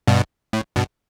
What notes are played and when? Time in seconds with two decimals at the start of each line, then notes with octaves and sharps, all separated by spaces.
0.07 G2 B2
0.53 A2
0.76 G2 B2